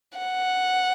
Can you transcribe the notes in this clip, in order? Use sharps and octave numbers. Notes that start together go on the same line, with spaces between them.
F#5